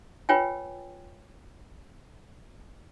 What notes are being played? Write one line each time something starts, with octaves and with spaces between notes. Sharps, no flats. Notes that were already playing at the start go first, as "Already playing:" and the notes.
F4 B4 C#5 G5 G#5